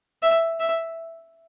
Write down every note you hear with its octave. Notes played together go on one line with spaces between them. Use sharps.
E5
E5